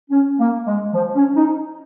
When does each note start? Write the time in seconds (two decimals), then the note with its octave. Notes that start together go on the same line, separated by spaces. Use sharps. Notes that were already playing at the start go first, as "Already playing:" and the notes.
0.10 C#4
0.39 A#3
0.66 G#3
0.93 F3
1.15 C#4
1.35 D#4